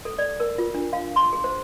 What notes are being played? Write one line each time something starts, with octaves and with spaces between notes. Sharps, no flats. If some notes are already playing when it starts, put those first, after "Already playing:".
A4
D5
A#4
F4
D4
F5
C6
G#4
C5